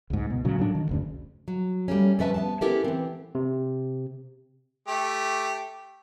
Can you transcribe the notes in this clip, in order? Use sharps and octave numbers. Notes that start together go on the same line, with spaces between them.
C#2 G#2
B2
A#2 C#3 F#3
A2 F#3 D4
D#3
F#1 D2 C#3
F#3
G3 A3 A#3 C#4
F2 C#4 B4 E5 A5
B3 F#5 A5
B3 C#4 E4 G4 A4 A#4
E3 C4
C3
A3 G4